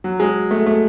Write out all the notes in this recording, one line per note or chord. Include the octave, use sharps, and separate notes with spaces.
F#3
G#3
A3
A3